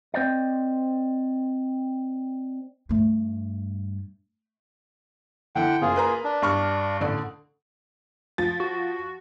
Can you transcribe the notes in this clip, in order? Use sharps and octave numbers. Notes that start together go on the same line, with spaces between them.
C4 C5 D5 D#5
G2 A3
D3 E3 F#5 G5
F#1 A#3 F4 G#4
A#4 B4 A#5
D4
G2 C#6 F6
A1 D3 D5
F3 A6
F#4